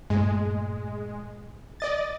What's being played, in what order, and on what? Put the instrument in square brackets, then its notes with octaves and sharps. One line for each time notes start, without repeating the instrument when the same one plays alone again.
[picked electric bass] G2 A#2 A3 [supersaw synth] G#3
[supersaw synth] D5 D#5 A6